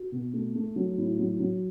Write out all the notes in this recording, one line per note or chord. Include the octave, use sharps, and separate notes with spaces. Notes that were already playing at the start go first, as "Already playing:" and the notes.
Already playing: F#4
B2
A3
A3
F#3
A2
F#3
F#3